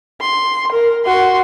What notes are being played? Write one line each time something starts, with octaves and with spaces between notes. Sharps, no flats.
C6
A#4
F#4 C6